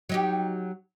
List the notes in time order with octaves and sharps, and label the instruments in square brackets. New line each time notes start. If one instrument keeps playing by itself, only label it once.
[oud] F#3 D#4 G4